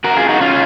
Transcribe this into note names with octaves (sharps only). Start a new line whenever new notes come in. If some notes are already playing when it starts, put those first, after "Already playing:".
F#4 A#4
F4 G#4
D#4 F#4
C#4 F4